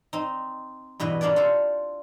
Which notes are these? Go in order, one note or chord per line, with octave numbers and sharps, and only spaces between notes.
C4 D#4
G2 B2 E3 B4 D#5
A#3 C#4 D4 G#4 D5
F4 A4 C5